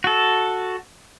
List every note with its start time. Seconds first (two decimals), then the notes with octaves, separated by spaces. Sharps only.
0.04 F#4 A4